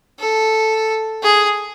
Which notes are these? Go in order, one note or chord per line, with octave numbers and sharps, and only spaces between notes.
A4
G#4